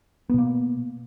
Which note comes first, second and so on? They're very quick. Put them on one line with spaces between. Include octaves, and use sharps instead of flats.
B3 B2 A#3